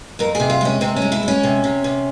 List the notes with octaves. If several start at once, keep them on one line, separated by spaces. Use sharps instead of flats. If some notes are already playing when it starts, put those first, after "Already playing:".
F2 A#4
C3 G#4
F4
G#3 C#4
C3 C4
C#4
G#3
E4
G#3 C#4
C3
C3
C3